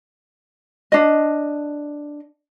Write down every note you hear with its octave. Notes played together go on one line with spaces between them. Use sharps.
D4 D#5